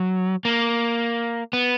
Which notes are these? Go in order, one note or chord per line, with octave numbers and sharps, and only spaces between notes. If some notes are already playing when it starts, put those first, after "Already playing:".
Already playing: F#3
A#3
B3